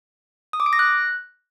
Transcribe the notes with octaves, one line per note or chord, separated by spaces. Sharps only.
D#6
D6
D7
A#6
F#6